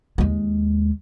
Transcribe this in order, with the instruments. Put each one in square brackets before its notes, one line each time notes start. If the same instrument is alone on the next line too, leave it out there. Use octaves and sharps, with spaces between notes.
[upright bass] D#2 G#3